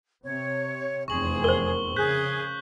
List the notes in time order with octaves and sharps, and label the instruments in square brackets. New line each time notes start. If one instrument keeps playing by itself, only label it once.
[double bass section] C3 [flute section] C#5
[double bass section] F1 E2 C4 [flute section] G#4 [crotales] C#6 F#7
[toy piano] A#4 C5 [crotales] G7
[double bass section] C#3 [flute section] G#4 [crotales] F#6 G6 B6